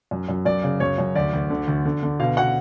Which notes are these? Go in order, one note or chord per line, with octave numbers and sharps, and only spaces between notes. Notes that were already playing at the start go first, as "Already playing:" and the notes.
F#2
F#2
F#2 D5
C#3
F#2 C#5
F#2
D2 D5
D2
D3
D2
D3
D3
B2 F5
B2 F#5